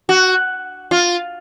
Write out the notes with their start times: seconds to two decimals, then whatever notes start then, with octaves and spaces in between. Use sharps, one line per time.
0.09 F#4
0.91 F4